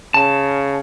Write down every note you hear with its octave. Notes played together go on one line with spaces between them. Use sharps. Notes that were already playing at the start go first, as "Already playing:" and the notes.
C#3 A5